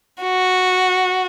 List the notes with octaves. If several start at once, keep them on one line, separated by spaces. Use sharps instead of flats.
F#4